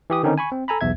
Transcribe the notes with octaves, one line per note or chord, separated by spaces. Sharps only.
E3 G4 D#6
D3 D#3 C4 C#4 D#4
G#5 B5 C#6
C4
A4 G#5 A#5 B5
B1 E2 E5 G#6